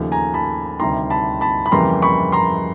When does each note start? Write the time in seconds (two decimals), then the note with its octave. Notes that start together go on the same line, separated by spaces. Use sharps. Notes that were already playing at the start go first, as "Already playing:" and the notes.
Already playing: D#2 C#3 F3 A3
0.12 G#5 A#5
0.34 A5 B5
0.80 D2 C3 D#3 G3 A#5 C6
1.10 A5 B5
1.41 A5 B5
1.66 B5
1.72 F2 C#3 E3 G3 A#3 A#5 C6
2.02 B5 C#6
2.32 A#5 C6